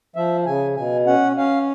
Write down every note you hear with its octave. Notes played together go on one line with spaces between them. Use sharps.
F3 E5
C#3 G#5
B2 G#5
C#4 F#5
C#4 F5